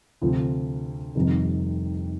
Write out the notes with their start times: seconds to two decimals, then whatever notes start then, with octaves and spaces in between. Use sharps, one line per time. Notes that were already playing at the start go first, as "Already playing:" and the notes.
0.21 D2 C3 F3 C4
1.15 F1 F2 C3 D#3 G3